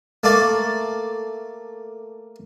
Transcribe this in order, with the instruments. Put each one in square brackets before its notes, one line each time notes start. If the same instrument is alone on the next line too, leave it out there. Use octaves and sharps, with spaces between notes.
[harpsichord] A3 A#3 D5